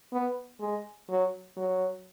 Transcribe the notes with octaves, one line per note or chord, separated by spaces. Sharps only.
B3
G#3
F#3
F#3